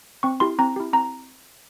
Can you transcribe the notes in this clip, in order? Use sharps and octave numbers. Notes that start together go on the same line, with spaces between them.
C4 C#6
E4 G4 C6
C4 A#5
E4 G4
C4 A#5